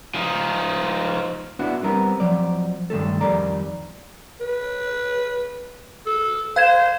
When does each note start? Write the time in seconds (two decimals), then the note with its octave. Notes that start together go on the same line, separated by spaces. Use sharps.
0.14 F3 D#4
1.59 B3 D4 E4 F#4
1.83 G3 B3 C4 A#4
2.20 F3 F#3 C4 D5
2.90 G2 D#3 A3 A4
3.21 F2 D#3 G3 D5 A#5
4.40 B4
6.06 A4
6.56 C5 F5 G#6 E7